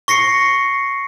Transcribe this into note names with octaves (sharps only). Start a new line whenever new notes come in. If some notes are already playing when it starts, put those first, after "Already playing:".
C#6 A#6 C7 C#7